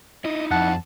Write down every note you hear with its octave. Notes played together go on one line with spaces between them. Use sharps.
D#4 E4 D#5
F2 F#5 A5